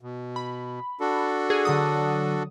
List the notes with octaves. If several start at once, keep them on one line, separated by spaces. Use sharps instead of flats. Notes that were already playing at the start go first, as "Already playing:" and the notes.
B2
B5
D4 F#4 A4
G#4
D3 F#3 D#6